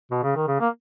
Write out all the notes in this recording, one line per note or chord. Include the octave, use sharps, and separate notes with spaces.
B2
C#3
D#3
C#3
A#3